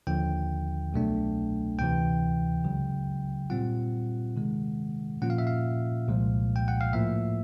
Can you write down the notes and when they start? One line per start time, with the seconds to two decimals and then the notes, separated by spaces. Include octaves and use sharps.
0.07 D#2 D3 F3 G5
0.93 C2 B2 F#3 A3 D4
1.78 D2 C3 E3 G5
2.64 C#2 C#3 F#3
3.50 A#2 G3 C4 F4 F#5
4.36 C3 D#3 G#3
5.22 A#2 F3 A#3 C#4 F4 F#5
5.30 F5
5.38 E5
5.47 F5
6.08 C2 A#2 F3 G#3
6.56 G5
6.68 F#5
6.81 F5
6.93 A2 F3 A#3 E5